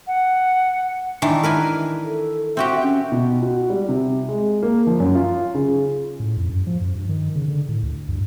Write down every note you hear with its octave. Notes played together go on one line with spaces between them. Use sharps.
F#5
D#3 E3 D4
A#4 B4 G#5
A4
C4 F#4 G4 E5
C#4
B2
F#4
G3
C3
G#3
A#3
F3
F#2
F4
C#3
A2
F2
F#2
F3
F#2
G2
D#3
C#3
D3
A2
D2
G2